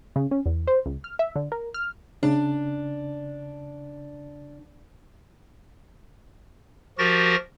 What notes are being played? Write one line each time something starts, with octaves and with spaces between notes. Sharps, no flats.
C#3
C#4
E2
C5
C#2
F6
E5
D3
A#4
F6
C#3 D4
F3 F#4 G4 A#4 A6 A#6